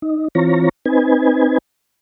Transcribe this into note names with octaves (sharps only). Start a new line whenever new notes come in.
D#4
E3 C4 F4 C#5 A#5
C4 D#4 B4 G#5